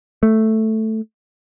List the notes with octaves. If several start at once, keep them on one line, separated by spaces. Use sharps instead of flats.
A3